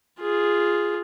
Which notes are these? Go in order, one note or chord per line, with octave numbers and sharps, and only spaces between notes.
F4 G#4